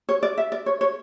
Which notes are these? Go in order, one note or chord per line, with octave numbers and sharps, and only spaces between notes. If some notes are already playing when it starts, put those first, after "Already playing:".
C#5
D5
E5
D5
C#5
C#5